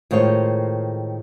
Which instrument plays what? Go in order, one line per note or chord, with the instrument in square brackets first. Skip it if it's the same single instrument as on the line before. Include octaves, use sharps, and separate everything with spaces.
[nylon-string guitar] A2 D#3 G#3 F4 C5 C#5